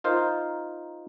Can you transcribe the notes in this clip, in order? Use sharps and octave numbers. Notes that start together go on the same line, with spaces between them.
D#4 F4 A#4 C5